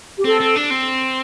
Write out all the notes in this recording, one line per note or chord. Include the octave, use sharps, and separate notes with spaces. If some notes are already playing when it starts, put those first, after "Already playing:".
G4
C4 A4
C4
D4
C4